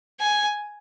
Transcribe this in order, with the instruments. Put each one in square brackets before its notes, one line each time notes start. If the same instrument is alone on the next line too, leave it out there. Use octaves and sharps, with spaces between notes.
[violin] G#5